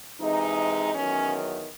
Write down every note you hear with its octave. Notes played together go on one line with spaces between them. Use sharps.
C3 E3 G#3 D#4
E2 D#3 F#3 C#4